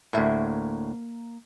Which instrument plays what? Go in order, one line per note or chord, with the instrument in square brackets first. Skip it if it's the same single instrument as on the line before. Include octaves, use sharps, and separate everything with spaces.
[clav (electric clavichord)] D2 A2 [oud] A#3 E5